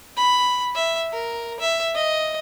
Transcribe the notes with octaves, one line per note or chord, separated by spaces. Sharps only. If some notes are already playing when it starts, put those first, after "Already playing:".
B5
E5
A#4
E5
D#5